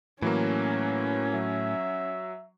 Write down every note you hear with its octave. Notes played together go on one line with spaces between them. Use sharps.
A2 E3 F#3 A#3 C#4
F#3 E5